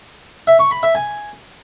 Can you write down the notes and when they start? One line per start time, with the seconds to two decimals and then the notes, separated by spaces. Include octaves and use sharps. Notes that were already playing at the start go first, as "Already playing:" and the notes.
0.47 E5
0.59 C#6
0.71 B5
0.83 E5
0.95 G#5